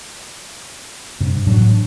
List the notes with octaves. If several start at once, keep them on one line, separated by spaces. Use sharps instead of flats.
G2 C3
A1 A2 F#3 D4